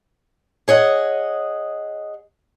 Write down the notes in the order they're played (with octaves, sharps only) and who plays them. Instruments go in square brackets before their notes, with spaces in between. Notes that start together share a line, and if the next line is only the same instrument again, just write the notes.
[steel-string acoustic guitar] G#4 C#5 D#5 F#5